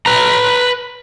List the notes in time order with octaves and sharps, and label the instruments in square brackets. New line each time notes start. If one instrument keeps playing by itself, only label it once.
[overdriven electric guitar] B4 A#5